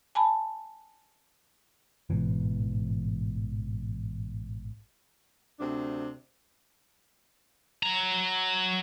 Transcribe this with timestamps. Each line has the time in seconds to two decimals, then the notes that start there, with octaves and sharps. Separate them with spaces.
0.15 G#5 A5 B5
2.10 A1 G#2 B2 E3
5.60 D2 C3 C4 D4
7.83 F#3 A#5